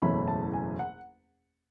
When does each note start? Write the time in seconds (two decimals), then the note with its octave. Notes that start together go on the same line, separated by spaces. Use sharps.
0.02 F#1 E2 B2 A3 C#4 B5
0.28 A5
0.53 G#5
0.79 F#5